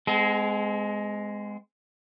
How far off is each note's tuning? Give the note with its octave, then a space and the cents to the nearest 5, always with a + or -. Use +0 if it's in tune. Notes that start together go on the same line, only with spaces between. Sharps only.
G#3 +0 C4 -45 A4 -45